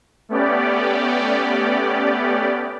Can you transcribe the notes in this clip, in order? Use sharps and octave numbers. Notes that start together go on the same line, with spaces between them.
A3 B3 C#4 G4 D5